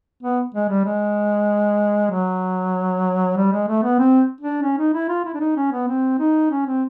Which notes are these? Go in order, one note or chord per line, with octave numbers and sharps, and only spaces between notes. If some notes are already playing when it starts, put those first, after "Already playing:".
B3
G#3
G3
G#3
F#3
G3
G#3
A3
B3
C4
D4
C#4
D#4
E4
F4
E4
D4
D#4
C#4
B3
C4
D#4
C#4
C4